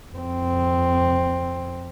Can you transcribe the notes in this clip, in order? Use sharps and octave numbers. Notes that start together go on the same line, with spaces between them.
F2 C4